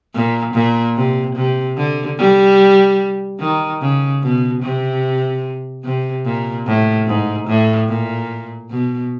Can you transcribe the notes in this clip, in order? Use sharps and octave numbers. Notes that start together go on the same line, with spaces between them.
A#2
A#2
C3
C3
D3
G3
D#3
C#3
B2
C3
C3
A#2
A2
G#2
A2
A#2
B2